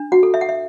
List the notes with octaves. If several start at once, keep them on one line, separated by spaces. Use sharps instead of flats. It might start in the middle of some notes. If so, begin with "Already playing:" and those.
Already playing: D4
F#4 F#5
A4
E5
F#5
E5